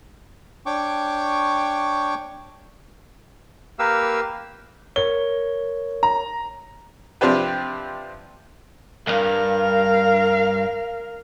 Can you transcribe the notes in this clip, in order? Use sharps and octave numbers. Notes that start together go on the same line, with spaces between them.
D4 C#5 G5 C#6 D6
A#3 G4 A#4 B4 F5 E6
A#4 C#5 G7
A#5
C3 F3 C4 D4 G4 B4
C2 G2 A#4 F5